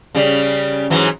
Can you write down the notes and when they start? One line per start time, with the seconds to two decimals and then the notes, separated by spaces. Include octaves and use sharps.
0.15 C#3 G3
0.90 G#2 E3 F#3